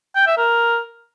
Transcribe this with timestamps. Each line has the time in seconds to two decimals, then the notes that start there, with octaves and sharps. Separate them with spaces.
0.15 G5
0.26 E5
0.37 A#4